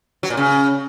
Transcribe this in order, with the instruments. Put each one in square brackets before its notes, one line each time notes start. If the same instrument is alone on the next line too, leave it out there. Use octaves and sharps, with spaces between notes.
[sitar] F#3
A#2
C#3